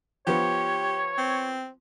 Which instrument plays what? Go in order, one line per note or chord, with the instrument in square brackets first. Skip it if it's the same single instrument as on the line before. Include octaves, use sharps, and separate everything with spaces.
[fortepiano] F3 B3 [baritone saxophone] G4 [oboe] C#5
[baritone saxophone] C4